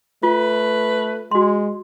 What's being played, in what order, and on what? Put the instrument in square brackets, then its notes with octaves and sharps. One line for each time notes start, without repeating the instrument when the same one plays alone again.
[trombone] A3 [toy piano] F4 [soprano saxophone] B4
[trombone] G#3 [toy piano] F#4 C6